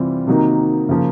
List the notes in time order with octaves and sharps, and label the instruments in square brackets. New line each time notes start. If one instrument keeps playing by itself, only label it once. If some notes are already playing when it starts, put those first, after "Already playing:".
Already playing: [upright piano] C3 E3 G3 C4 F4
C3 D#3 F#3 A#3 D#4
C#3 F3 A#3